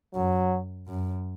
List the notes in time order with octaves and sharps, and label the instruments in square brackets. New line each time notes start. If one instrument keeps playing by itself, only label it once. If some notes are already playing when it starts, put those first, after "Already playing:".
[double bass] F#2 [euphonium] F#3
[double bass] F#2